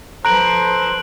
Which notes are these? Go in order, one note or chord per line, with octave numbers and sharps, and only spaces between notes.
F3 A4 B4 C5 A#5 F#6 D7 F#7